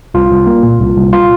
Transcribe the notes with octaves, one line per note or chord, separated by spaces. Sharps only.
C2 F4
C2
A#3
A#2
C2
C2
F4